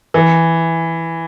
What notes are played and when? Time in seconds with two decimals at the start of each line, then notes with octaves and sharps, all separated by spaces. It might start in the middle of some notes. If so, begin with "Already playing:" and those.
0.14 E3